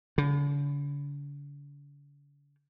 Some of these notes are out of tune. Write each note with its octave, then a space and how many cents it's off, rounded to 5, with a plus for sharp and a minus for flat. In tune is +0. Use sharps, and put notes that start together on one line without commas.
D3 -45